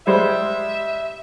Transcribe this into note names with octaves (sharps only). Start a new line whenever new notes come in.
G3 G#3 C5 E5